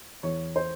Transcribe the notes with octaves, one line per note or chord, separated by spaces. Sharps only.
E2 C#5
C5